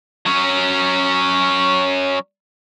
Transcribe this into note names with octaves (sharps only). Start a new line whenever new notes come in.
F#3 C#4